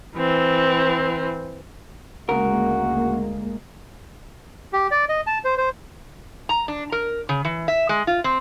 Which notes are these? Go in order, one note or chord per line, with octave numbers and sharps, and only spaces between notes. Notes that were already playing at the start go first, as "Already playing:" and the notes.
E3 C4
D2 C#3 G#3 A#3 F#4 A#4
G4
D5
D#5
A5
C5
C5
A#5
D4
A#4
C#3
E3
E5
G#3
F4
C4